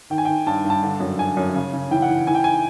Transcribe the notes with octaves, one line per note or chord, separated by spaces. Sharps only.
D#3 G5
G#5
D#3 G5
G2 A5
G2
A5
D3
F#2
D3 G#5
F#2
C#3
C#3
E3 G5
F#5
E3
E3 G#5
G5
G#5